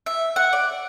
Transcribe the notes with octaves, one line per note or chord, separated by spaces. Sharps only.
E5
F#5
D5